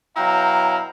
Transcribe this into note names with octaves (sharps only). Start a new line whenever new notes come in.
B2 F#3 E4 F5 G5 A#5